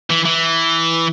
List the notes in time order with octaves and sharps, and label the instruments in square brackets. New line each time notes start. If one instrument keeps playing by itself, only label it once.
[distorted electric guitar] E3
E3